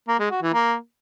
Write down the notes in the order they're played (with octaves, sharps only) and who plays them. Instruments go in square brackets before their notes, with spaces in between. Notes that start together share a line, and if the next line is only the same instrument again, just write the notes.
[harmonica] A#3
G#3
F#4
E3
A#3